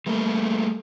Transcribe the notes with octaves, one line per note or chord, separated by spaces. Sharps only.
G3 A3 A#3